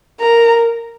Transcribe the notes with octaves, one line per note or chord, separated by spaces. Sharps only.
A#4 A#5